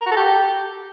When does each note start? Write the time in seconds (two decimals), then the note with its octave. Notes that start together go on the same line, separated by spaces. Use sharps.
0.01 A#4
0.06 F#4
0.11 A4
0.16 G4